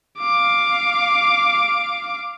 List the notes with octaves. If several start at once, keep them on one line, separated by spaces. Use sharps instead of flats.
F5 D6